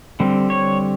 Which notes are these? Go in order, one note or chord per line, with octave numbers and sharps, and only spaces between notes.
D3 G3 C4
C#5